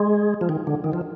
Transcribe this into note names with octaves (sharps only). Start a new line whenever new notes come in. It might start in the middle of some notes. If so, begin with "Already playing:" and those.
Already playing: G#3
F3
D#3
D3
D#3
F3